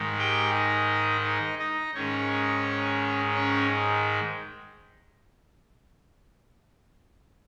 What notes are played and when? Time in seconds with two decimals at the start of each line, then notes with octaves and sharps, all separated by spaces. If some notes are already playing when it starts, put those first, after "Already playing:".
Already playing: G#2 D#3 G#3
0.18 G4 G5
0.53 D#4 D#5
1.24 D#4 D#5
1.58 D#4 D#5
1.94 G#2 D#3 G#3 C#4 C#5
3.35 C#4 C#5